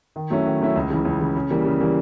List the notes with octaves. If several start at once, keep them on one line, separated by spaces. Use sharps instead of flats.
D#3
F#3 A3 C#4 E4
D#3
F#3 A3 C#4 E4
C#2
C#3 E3
C#2
C#3 E3
C#3
E3 G3 A#3
C#3
E3 G3 A#3